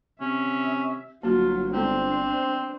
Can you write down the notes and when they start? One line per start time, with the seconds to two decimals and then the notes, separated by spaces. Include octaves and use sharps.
0.21 C3 C#4 E5
1.23 G1 F#3 A#3 F4 F#4
1.73 G#3 B3 C4 D4 A4 C5